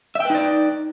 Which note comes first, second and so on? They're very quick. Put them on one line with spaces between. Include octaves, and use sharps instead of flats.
E5 G5 B4 D#4 D5